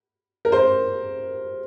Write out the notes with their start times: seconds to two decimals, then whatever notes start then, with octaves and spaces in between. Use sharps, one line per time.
0.45 A#4
0.52 C5